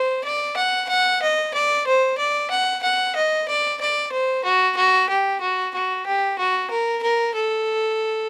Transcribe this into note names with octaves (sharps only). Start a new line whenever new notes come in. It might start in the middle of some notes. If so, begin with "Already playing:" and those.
Already playing: C5
D5
F#5
F#5
D#5
D5
C5
D5
F#5
F#5
D#5
D5
D5
C5
F#4
F#4
G4
F#4
F#4
G4
F#4
A#4
A#4
A4